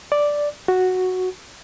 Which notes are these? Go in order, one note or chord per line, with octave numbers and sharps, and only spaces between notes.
D5
F#4